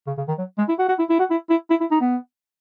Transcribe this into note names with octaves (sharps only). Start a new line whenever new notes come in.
C#3
C#3
D#3
F#3
G#3
E4
F#4
F#4
E4
E4
F#4
E4
E4
E4
E4
D#4
B3